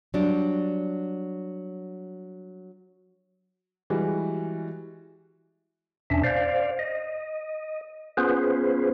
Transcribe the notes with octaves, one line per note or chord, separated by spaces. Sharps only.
F#3 G3 D4
E3 G3 G#3 F#4
E2 B2 C#4 D4 E5
C5 D5 F5
D#5
B3 C#4 F4 G#4 B4 C5